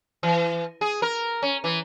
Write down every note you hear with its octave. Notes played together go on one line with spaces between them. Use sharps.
E3
G#4
A#4
C#4
E3